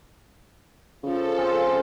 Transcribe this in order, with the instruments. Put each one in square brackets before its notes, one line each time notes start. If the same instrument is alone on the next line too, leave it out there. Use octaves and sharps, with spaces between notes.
[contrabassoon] C#3 [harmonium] F3 [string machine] A4
[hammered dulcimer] C4 F4 G#4